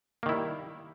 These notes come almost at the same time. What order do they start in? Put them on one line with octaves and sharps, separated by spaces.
A#3 D#3 E4 G3